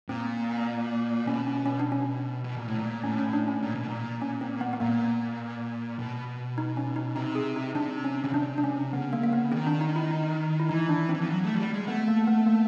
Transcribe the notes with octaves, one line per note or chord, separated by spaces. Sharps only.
A#2 C4
B2 C#4
C#4
C#4
D4
C#4
B2
A#2
A2
A#2
A2 C#4
C#4
D4
C#4
A#2
B2
A#2
C#4
C4
B3
B3
A#2 A#3
B2
D#4
C#4
D#4
C3 D#4
G#4
D#4
C3 D4
C#4
C#3 C#4
C3 D4
D4
C#4
C#3 B3
A#3
A#3
B3
D#3 C4
D4
D#4
E4
D#4
E4
E3 D#4
D4
C4
E3
F3
F#3
A3
F#3
G3
G#3
A3 B3
A#3
B3
A#3